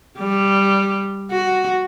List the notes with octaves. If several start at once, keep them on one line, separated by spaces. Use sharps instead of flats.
G3
F#4